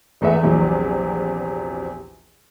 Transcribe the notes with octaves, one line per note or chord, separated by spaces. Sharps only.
A1 E2 A3 B4 E5 F#5
A#1 E2 C3 E3 F#3